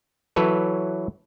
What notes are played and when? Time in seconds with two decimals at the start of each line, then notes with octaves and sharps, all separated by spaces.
0.36 E3 F#3 A4 B4 C#5